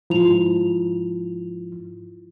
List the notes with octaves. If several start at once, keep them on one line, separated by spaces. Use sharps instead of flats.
G#2 F3 E4 F4 F7